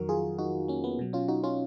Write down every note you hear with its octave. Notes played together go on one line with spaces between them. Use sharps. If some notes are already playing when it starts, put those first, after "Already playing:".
Already playing: F2 D#3 F#3 F#4 A#4
F4 G#4
D#4 F#4
A#3 C#4
B3
B2 F#3
C#4 F4
D#4 F#4
C#4 F4